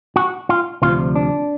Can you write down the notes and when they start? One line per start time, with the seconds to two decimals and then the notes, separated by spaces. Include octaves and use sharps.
0.16 F#4
0.49 F4
0.82 D2 C3 F3 F4
1.16 D4